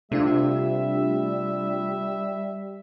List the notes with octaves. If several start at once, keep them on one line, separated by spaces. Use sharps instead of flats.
C3 G3 A3 D4 F4 E5